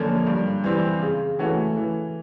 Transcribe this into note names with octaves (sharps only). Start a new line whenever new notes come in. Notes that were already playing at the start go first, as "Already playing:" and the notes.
Already playing: F#2 D3 F3 A#3 C#4
G2
E3 G3 C4
C#3
E3 A3 C#4 F#4
E3